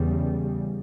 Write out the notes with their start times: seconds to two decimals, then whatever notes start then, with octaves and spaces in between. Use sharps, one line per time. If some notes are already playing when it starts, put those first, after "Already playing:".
Already playing: E2 C#3 G3